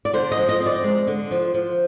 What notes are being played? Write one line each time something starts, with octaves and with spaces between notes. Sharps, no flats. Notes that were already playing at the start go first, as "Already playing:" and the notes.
D5
D3 C5
D#5
F3
D#5
C4
D5
G#3
D3
F3
F3